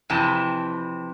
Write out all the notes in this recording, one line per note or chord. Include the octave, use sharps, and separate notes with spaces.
F2 C3 E3 C4 A5